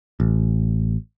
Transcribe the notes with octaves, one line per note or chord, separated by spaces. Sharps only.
A1